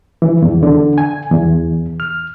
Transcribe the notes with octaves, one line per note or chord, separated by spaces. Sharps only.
E3
E2
D3
G#5
E2
F6